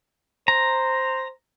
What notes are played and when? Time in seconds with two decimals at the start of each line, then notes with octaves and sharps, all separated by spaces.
0.48 C5 A#5